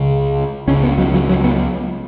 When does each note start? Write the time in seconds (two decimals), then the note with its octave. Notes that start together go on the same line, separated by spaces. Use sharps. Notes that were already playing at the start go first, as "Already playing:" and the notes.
Already playing: C#2 C#3
0.67 C#2 C#4
0.71 C#3
0.83 B3
0.98 F#3
1.14 F#3
1.29 F#3
1.44 B3